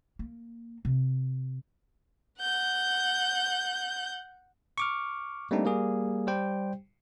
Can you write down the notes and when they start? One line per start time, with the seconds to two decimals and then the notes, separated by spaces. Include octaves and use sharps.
0.19 A#3
0.85 C3
2.41 F#5 G6
4.78 C#6 D6 F6
5.51 G3 A3 A#3 C4 D4 D#4
5.65 G3 A#3 G#4
6.27 G3 G4 C5 G5